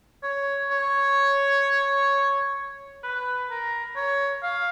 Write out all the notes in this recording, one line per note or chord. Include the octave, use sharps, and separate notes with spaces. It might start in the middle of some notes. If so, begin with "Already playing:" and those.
C#5
C#5
B4
A#4
C#5
F5